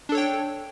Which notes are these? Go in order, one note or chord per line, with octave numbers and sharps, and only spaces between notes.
D4 A4 C#5 G5